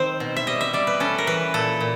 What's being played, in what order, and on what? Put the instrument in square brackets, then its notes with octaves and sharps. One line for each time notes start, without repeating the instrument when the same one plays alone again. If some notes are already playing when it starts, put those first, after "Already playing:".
Already playing: [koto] D#3 C4 C5
B2
E5
G3 D#5
E5
G3 D5
B4
C#4 A4
A#4
E3 B4
A#2 A4
A#2